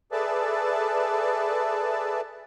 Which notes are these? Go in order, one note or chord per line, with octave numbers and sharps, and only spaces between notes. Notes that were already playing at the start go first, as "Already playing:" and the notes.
G#4 A4 B4 D5 E5 A5